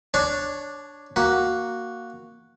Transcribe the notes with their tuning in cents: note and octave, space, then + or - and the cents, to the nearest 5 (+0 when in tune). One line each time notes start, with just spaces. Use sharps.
D4 +0 C#5 +0 A5 -35
A#3 +0 F#4 +0